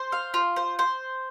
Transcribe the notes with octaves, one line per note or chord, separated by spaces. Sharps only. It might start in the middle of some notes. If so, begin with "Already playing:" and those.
Already playing: C5
F5
F4
C5
C5